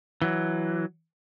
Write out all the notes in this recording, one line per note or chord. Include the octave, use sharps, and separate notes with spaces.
E3 F#3